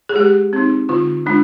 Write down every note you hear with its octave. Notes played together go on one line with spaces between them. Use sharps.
G#4
G#3 G4
C4 D#4
D3 F4
G#3 D4 F4